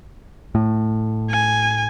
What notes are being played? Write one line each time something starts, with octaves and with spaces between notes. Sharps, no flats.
A2
G#5